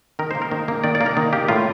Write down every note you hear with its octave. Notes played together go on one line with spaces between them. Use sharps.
D#3 A#4
A#3 C5
A#4
D#3
A#3
D#3 D5
D5
A#3
A#4
D#3
A#3 G4
A2 F4